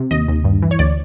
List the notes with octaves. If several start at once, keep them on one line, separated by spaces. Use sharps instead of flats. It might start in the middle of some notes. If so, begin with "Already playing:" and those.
Already playing: C3
D#2 D#5
D#2
G2
E3
C#5
D2 D5